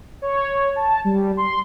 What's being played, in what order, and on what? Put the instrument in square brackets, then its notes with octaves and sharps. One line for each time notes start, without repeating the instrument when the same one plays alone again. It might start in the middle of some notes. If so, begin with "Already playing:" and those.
[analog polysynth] C#5
A5
G3
C6